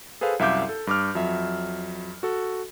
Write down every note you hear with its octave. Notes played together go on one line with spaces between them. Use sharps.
G#4 A4 B4 C5 F5
C2 F#2 E5 F5 D6 G6
A4
G2 D6 F6
F2 F#3 E5
F#4 A4